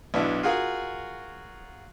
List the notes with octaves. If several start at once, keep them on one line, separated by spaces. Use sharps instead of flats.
B1 B3 D4 E4 E5
F4 F#4 G#4 A#4 F5